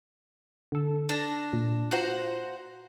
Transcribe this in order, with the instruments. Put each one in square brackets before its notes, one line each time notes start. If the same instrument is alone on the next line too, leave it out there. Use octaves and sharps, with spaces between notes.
[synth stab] D3 A4
[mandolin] D4 [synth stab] A5 A#6
[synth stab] A#2
[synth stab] F4 A#5 F#6 [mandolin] F#4 C5 F#5